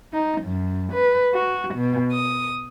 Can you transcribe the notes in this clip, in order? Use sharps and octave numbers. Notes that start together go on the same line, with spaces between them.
D#4
F#2
B4
F#4
B2
D#6